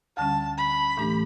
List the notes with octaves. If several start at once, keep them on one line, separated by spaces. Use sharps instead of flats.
D2 D3 G3 C#4 A5
B5
A2 E3 A3 D4 G4